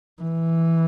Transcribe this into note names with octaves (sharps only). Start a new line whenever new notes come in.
E3